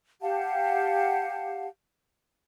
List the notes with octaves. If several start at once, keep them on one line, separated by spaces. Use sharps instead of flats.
G4 F5 F#5 A5